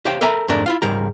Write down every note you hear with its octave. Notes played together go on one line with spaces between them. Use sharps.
G4 C5 C#5 F5 G5
A4 A#4 E5 G#5 A#5 B5
F2 G#2 A3 D4 A#4
E4 F4 F5
C#2 G#2 G3 G#4 A#4 A#5